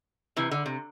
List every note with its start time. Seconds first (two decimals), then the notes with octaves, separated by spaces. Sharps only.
0.37 C3 E3
0.51 D3
0.66 C3